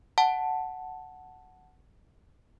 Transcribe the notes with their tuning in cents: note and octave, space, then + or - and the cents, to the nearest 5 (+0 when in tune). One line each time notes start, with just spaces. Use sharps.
F#5 +0 A5 +0